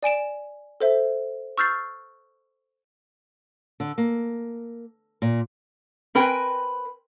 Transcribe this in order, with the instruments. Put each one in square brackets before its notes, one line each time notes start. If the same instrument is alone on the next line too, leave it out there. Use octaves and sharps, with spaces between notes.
[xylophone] D5 G#5 D7 E7
A4 C5 E5
C#6 E6 F6 G6 A6 C7
[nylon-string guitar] D3
A#3
A#2
[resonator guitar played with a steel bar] C4 A#4 B4 G5 G#5